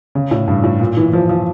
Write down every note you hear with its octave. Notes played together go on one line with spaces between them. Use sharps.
C#3
A2
G2
A2
A#2
E3
F3
F3